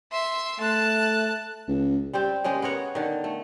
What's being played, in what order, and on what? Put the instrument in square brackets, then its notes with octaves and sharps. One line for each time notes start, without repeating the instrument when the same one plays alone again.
[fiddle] E5 C6
[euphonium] A3 [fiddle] A5 F#6
[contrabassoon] C#2
[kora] G3 C4 G4
C#3 G#3 A#3 G4
B3 A#4 C#5 F#5
D3 D#3
A3